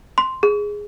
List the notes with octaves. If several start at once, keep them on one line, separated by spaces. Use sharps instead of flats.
C6
G#4